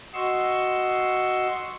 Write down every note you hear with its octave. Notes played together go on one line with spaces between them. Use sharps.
F#4 D#5 C6 C#6 E6